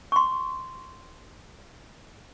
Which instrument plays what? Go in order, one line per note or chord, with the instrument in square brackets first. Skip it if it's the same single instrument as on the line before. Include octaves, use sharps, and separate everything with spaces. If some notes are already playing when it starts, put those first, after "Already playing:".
[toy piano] C6 C#6